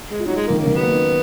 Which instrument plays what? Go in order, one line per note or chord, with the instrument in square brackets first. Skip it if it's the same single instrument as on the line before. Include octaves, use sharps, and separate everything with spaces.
[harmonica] G#3
[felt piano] F4
[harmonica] F#3 [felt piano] D#4
[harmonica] G#3
A#3
[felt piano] D#3
[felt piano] C#3 [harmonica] A#3
[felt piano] D#3
[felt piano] F#3 [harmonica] B3
[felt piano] A#3
D#4